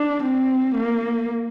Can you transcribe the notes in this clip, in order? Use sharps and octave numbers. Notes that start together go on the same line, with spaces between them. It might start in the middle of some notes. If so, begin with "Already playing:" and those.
Already playing: D4
C4
A#3